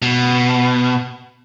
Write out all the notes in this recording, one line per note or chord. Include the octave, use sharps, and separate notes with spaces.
B2